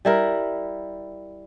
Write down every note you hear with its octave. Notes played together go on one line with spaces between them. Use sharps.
G3 E4 A#4